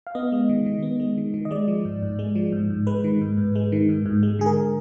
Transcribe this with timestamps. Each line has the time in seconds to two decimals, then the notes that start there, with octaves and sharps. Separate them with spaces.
0.07 F5
0.15 B3 D#5
0.32 G#3
0.49 D#3
0.66 D#3
0.83 B3
1.00 G#3
1.18 D#3
1.34 D#3
1.45 D#5
1.51 G#3 D5
1.68 F3
1.85 G#2
2.02 G#2
2.19 G#3
2.35 F3
2.52 G#2
2.70 G#2
2.87 G#3 B4
3.04 D#3
3.21 G#2
3.38 G#2
3.55 G#3
3.72 D#3
3.89 G#2
4.06 G#2
4.23 G#3
4.39 D3 G#4
4.46 A#4